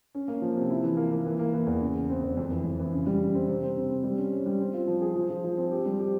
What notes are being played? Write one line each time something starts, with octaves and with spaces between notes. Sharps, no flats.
C#4
A#3
F3
C3
E4
E3
A#3
A#3
E3
A#3
E3
E2
C#3
C#3
C4
E2
F2
E3
F2
E3
C#3
G3
C#3
C4
C3
C4
C3
C4
G3
C#4
C#4
G3
C4
F4
F3
G#4
F3
F3
F3
C4
G4
G3
G4